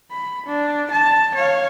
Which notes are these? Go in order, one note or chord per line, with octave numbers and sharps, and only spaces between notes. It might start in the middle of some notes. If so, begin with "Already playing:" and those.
B5
D4
A5
C#5 F5